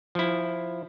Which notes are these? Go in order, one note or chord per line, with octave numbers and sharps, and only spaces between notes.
F3 E4